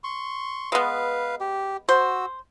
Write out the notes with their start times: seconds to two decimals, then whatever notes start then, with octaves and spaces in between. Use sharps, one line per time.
0.04 C6 C#6
0.72 G#3 B3 B4 F5
1.40 G4
1.89 F#4 C5 E6